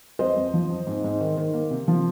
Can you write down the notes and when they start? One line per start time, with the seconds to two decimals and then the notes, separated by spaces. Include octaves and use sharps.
0.19 F2 C5 D#5
0.36 F2
0.54 F3
0.70 F2
0.87 G#2
1.04 G#2
1.21 D#3
1.37 D#3
1.54 A#3
1.71 C3
1.88 F3